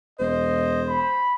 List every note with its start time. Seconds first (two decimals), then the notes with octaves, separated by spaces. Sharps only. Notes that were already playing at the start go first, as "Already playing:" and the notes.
0.19 E1 C5 D#5
0.89 B5